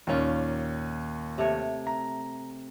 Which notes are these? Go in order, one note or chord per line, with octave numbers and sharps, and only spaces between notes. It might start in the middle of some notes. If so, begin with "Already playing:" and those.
D#2 A#2 A#3 C#4 F4
C3 A3 C#5
A#5